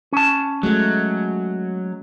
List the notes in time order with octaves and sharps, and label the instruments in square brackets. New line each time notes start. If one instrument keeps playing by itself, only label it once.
[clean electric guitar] C#4 A5
[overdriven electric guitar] F#3 [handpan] G#3 A3